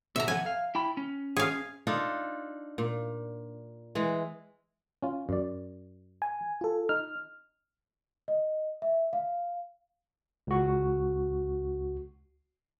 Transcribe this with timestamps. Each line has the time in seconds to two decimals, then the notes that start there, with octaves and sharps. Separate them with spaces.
0.16 B2 E5 A#5
0.28 F2 A4 F#5 G#5
0.46 F5
0.75 E4 G5 B5
0.97 C#4
1.37 G#4 F5
1.87 D4 D#4 F4 A4
2.78 A#2
3.95 E3 G#3
5.03 C#4 F4
5.29 F#2 D5
6.22 G#5
6.61 F4 A4
6.89 D#4 F6
8.28 D#5
8.82 E5
9.13 F5
10.47 C#2 F#4